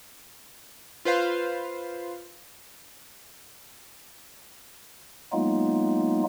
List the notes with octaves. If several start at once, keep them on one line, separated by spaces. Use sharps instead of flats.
F4 B4 C5 F5
F#3 G#3 A#3 B3 D#4 F4